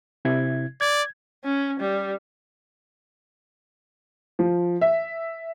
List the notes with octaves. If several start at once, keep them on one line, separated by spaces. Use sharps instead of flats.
C3 E4 G#6
D5 G#6
C#4
G3
F3
E5